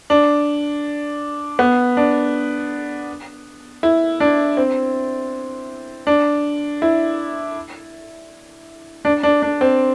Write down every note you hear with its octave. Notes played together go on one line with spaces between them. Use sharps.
D4
B3
D4
E4
D4
C4
D4
E4
D4
D4
D4
C4